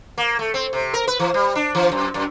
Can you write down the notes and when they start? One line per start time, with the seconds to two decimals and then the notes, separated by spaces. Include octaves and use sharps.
0.18 A#3
0.39 A3
0.54 C4
0.73 C3
0.94 A#4
1.07 B4
1.19 E3
1.34 G3
1.55 D4
1.75 E3
1.92 F#2
2.14 F#2